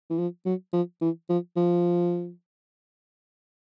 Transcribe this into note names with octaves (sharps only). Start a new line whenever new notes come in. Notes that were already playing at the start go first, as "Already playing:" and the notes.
E3
F3
F#3
F3
E3
F3
F3